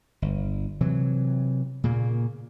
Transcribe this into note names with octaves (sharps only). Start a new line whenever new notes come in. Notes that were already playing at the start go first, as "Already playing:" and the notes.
G1
C3 E3 F#3
A#2 C#3 A#3